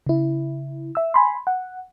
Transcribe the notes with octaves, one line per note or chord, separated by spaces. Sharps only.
C#3 E4
E5 E6
G#5 B5 C6
F#5